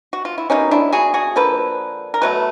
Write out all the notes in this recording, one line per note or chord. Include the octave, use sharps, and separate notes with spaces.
F#4
F4
E4
B2 G3 A#3 C#4 D#4
D4 E4
F#4 G#4
F#4 G#4
D3 F3 A#3 A4 B4
A#4
B2 F#3 A3 B4